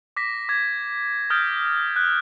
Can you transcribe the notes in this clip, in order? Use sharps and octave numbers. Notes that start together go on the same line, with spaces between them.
D6 A#6 B6
D6 G#6
D#6 F6 G6 A6 D7
F#6